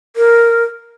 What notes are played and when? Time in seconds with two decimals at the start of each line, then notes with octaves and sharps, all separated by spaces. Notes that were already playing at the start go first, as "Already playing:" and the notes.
0.16 A#4